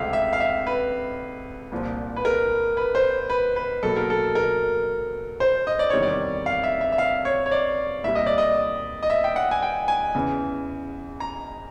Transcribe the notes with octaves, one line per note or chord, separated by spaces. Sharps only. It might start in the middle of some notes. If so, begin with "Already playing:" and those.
Already playing: C#2 C3 F3 A3 C4 E5 F5
E5
F5
E5
B4
C2 A#2 F3
B4
A#4
B4
C5
B4
B4
B2 F#3 A#3 A4
A#4
A4
A#4
C5
D#5
D5
E2 C3 D#3 G3 C#5
D5
F5
E5
E5
E5
F5
C#5
C#5
D5
C2 A#2 G3 E5
D#5
D5
D#5
D#5
E5
G5
F#5
G#5
G5
G#5
E2 C#3 E3
A#5